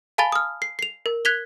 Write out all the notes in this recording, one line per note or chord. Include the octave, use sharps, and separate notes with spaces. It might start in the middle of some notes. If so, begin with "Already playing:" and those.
F5 G#5 A5 B5 A6 G7
D#6 F6
C7
C7 F7
A#4
F#6 G#6 B6 F7 G7